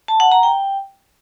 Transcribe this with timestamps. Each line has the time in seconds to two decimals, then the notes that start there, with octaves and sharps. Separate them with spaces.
0.08 A5
0.20 F#5
0.32 A#5
0.43 G5